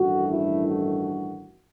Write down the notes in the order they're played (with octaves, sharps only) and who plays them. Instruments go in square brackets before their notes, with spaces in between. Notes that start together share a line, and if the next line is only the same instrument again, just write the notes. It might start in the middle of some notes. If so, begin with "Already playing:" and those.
Already playing: [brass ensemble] A1 G2 D#3 A3 F#4
E4
F#4